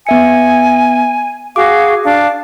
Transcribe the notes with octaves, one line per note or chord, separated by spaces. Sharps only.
B3 E5 G#5 C#7
F#4 G#4 F5 D6
D4 F5